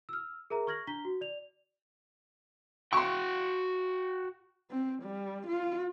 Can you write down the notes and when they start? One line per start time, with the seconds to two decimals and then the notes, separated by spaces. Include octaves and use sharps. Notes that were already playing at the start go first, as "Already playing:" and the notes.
0.09 E6 F6
0.50 G#4 A#4 E5 A#5
0.67 C#6 F6 G#6 A#6 F#7
0.87 D4 A#5 B6 G7
1.05 F#4
1.21 D5 F7
2.93 F#4 G5 C6 C#6
4.70 C4
5.03 G3
5.47 F4